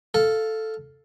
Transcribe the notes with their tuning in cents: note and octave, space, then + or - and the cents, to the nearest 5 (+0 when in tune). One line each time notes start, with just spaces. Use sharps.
A4 +0 F5 +0